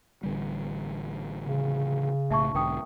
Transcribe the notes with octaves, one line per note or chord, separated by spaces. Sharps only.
A1 D3 G3
C#3
B1 A2 E5 A5 C#6
B1 G#2 D3 A#4 G5 D#6